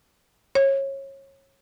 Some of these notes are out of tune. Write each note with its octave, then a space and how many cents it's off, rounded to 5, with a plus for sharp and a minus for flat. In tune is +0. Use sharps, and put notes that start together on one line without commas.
C#5 -25